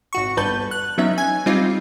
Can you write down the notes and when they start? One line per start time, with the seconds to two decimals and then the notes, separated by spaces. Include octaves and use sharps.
0.13 G#1 F#4 C#6
0.37 G1 G2 B4 A5 G6
0.71 F#6
0.98 F#3 B3 C#4 D#4 E5
1.18 G#5 G#6
1.46 G3 C4 D#4 F4